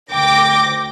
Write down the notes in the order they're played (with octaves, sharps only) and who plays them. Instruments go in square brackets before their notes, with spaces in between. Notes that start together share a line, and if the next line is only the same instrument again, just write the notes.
[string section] D2 D6 A#6 [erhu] G5